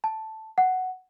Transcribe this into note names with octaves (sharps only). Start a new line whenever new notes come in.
A5
F#5